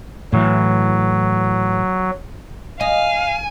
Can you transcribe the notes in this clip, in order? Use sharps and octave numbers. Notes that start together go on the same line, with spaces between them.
A2 E3 F#3
D#5 F5 G#5